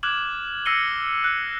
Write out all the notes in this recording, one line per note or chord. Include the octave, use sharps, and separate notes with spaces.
D6 F6 F#6 G#6 E7 F#7
E6 A#6 C7 C#7 D#7 G7
F#6